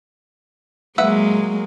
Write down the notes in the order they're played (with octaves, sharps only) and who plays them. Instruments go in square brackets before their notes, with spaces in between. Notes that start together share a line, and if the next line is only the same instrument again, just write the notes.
[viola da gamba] F#3 G#3 A#3 [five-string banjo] B4 E5 F#5